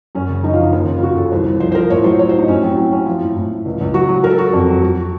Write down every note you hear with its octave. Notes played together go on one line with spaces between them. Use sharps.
F#2 C#4
C#3
F#2 D#4
F3 F4
D#4
D#2 F4
C#3
F4
C#3 F#4
C#3 A4
C2 C5
C2
F3 C5
C5
F3 A#4
A2 C#5
F#3 C5
F#3 C#5
C5
A2 D#4
A2 C#4
F#3 C4
C#4
F#3 C4
F#3 C#4
F3 F4
A2
A2
A2
C#2
C#2
F#3 F#4
F#3
F#3 A#4
A4
F#3 F#4
A4
F2
F#3
F#3
F#4